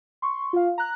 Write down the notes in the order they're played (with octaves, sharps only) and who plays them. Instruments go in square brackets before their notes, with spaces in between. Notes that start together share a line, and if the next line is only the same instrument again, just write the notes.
[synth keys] C6 C#6
F4 F5
A#5 F#6